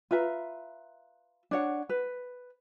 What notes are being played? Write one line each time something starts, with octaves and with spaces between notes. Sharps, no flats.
F4 B4 E5 A#5
D4 C#5 F#5
B4